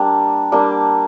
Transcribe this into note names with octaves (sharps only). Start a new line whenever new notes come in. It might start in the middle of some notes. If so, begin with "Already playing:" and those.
Already playing: G3 A#3 D4
G3 A#3 D4